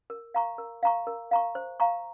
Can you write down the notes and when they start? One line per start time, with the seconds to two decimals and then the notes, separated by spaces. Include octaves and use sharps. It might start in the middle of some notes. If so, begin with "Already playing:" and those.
0.10 A#4
0.34 F5 A#5 C#6
0.58 A#4
0.83 F5 A#5 C#6
1.07 A#4
1.31 F5 A#5 C#6
1.55 C5
1.80 F5 A#5 C#6